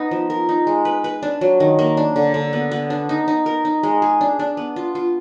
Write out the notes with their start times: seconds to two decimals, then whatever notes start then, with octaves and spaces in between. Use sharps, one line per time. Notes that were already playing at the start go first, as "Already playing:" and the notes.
Already playing: B3 D#4
0.11 F3
0.30 A#4
0.49 D#4
0.67 G#3
0.85 B4
1.04 B4
1.23 D4
1.41 F#3
1.60 D#3
1.79 A#3
1.97 D4
2.16 D3
2.34 D3
2.53 B3
2.71 B3
2.90 D4
3.09 D#4
3.28 D#4
3.46 A#4
3.65 D#4
3.83 G#3
4.02 G#4
4.21 D4
4.39 D4
4.57 B3
4.76 F4
4.95 F4